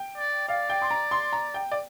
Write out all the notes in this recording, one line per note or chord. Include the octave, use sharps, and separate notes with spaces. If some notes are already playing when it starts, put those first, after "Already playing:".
Already playing: G5
D5
D5 F5
G5
C6
A#5
C6
A#5
G5
D5